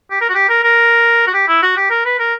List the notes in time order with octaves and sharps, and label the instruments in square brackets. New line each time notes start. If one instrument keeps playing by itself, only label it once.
[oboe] G4
A#4
F#4
G4
A#4
A#4
F#4
G4
E4
F#4
G4
A#4
B4
A#4